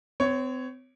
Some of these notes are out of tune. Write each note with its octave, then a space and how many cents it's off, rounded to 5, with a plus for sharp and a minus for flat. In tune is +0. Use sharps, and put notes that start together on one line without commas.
C4 -40 C#5 +0